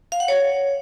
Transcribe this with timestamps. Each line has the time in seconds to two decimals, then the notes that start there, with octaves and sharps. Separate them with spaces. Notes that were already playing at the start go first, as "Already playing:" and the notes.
0.12 F5
0.20 F#5
0.28 C#5